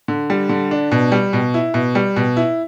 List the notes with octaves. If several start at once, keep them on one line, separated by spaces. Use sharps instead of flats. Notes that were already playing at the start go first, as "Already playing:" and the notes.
D3
G3
D3
D4
B2
G3
B2
E4
B2
G3
B2
E4